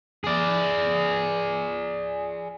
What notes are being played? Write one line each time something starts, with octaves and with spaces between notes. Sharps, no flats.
G#4 D5